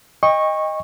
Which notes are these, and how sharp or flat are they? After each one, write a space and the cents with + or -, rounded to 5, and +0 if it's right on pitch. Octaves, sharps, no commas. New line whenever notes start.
D#5 +0 G5 +35 C#6 -15